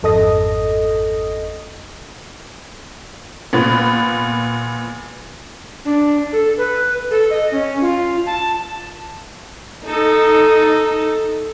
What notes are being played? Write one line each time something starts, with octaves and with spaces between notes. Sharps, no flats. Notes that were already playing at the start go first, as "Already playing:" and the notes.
G#1 F2 A4 D#5 D#6 A#6
A#2 B3
D4
A4
B4
A4
D#5
C#4
F4
A5
D#4 A4